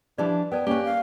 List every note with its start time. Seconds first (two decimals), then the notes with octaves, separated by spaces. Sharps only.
0.18 E3 F3 D4 G4 D5
0.52 B3 A#4 D5 G5 A5
0.67 A#3 C#4 G4 B4
0.85 F5